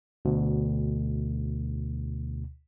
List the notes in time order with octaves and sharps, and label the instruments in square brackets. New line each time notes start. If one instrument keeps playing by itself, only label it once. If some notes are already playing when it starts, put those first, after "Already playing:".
[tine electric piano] D2 B2